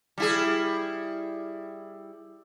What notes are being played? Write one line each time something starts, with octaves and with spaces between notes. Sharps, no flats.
G3 E4 G#4